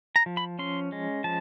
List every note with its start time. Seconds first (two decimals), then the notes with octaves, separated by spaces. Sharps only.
0.16 A#5
0.26 F3
0.37 B5
0.59 C#4 C6
0.92 G#3
1.24 F3 A5